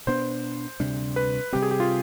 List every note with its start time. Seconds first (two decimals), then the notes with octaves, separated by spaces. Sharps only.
0.07 B2 B3 D4 C5
0.80 D2 C3 G3 D4
1.16 B4
1.53 C3 G3 C4 G4
1.62 G#4
1.71 G4
1.80 F4